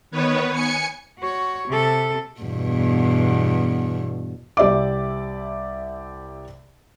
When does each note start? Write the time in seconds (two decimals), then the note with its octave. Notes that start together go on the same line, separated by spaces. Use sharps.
0.11 D#3 B3 B4 C#5
0.52 G#5 C#7
1.19 F#4 C#5
1.68 C3 A4
2.40 E2 G2 B2
4.57 C2 G4 D5 E5 D6